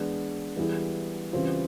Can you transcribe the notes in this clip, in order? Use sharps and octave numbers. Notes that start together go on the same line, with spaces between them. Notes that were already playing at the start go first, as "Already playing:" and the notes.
Already playing: E3 G#3 B3 D4
E3 G3 B3 E4 G#4
C#3 E3 G3 C4 F4